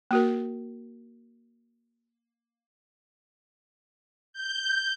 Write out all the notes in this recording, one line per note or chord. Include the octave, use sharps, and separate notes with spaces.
A#3 F#4 A#4
G6